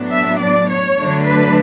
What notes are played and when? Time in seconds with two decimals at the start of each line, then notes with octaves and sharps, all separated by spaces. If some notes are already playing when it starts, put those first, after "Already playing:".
Already playing: A2 F#3 B3 D4
0.11 E5
0.40 D5
0.69 C#5
0.97 D3 F#3 A3 D4
1.25 B4